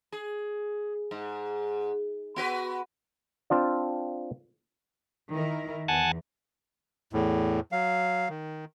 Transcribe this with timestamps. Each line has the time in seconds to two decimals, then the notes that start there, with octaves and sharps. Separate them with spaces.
0.12 G#4
1.11 G#2
2.36 B3 F#4 B4
3.50 C4 D4 F4 D5
5.32 D#3 E4 A#4
5.88 E2 F#5 G#5 A5
7.13 E2 A2
7.72 F#3 F5
8.29 D#3